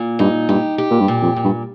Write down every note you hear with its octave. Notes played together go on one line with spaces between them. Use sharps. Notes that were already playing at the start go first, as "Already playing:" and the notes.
Already playing: A#2
G2 D#4
G2 G4
G4
A#2
G2
A#2
F2
A#2
G2